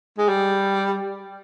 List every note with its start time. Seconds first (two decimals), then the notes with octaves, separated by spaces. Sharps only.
0.18 G#3
0.28 G3